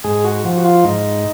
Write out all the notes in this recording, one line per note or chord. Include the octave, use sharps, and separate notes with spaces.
G#2 G#4
F#4
F3
F#4
F4
G#2 D#4